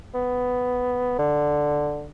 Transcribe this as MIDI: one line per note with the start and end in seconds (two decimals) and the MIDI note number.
0.14 1.18 59
1.19 2.10 50